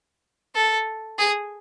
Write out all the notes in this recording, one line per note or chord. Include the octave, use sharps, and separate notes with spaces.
A4
G#4